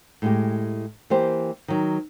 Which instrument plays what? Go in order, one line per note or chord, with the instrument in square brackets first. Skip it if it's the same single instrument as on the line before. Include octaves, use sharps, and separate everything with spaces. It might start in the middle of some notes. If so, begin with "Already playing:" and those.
[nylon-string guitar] A2 G#3 G4
E3 A#3 G4 C5
D#3 F#3